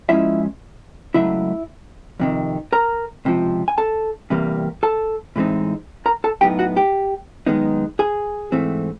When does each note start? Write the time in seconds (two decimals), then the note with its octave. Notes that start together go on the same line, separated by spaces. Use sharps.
0.09 G#2 F3 G#3 C#4 E4 E5
1.14 C#2 C#3 F#3 A3 E4 E5
2.20 F2 C3 D#3
2.73 A#4 A#5
3.25 C#2 C3 F3
3.68 G#5
3.78 A4 A5
4.30 E2 C3 E3 G3 A#3
4.83 A4 A5
5.36 A2 E3 G#3 C4 D#4
6.06 A#4 A#5
6.24 A4 A5
6.41 A2 F#3 B3 D#4 G4 G5
6.59 F#4 F#5
6.76 G4 G5
7.46 F#2 D#3 G#3 B3 D#4
7.99 G#4 G#5
8.52 G#2 E3 A3 C4